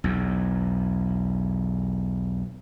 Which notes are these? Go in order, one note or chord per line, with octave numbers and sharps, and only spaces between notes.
B1 E2